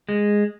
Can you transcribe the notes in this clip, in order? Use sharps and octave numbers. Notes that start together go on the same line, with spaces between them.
G#3